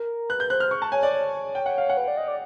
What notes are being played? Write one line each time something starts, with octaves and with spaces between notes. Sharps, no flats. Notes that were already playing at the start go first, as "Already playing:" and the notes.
Already playing: A#4
B4 F#6
G6
C5 F#6
F6
C#6
A5
C#5 G#5
D5
C#5
G5
F#5
F5
F#5
B4
D5
D#5
D5